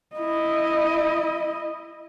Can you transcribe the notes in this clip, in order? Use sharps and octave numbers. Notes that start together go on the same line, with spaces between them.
E4 D#5